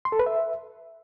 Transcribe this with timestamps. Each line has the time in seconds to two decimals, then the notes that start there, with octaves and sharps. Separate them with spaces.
0.05 C6
0.12 A4
0.19 B4
0.26 E5